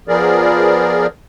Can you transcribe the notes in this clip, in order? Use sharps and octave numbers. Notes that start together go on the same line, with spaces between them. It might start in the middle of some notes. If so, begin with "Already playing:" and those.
F3 B3 G#4 A#4 D5